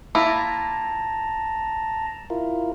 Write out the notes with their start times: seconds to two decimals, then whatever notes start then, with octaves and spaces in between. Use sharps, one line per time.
0.15 A#3 E4 F4 A5 A#5
2.30 E4 F4 A#4